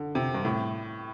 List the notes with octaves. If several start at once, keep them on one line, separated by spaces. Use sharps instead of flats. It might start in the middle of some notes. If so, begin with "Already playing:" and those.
Already playing: D3
C3
G2
A2